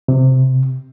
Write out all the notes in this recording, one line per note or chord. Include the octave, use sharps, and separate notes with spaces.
C3